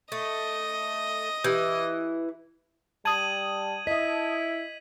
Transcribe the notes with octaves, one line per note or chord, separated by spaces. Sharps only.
A3 D#5
E3 G4
G3 A5 D#6 G#6 D#7 F#7
E4 D#5 E5 B6